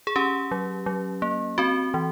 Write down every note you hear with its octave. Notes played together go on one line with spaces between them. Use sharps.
G#4
C#4 G4
F#3
F#3
A#3
C4 F#4
E3